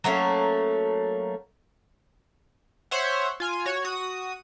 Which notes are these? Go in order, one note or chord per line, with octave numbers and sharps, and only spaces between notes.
F#3 A3 A#3 C#4
C5 C#5 E5 F#5
F4 G#5
F#4 C#5
F#4 D#6